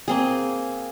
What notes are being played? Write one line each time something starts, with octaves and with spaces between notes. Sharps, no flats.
A#3 C4 G#4